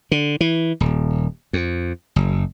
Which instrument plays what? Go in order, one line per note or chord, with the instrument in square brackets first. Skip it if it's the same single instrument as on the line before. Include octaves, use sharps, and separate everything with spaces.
[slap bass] D3
E3
D#1
F2
F#1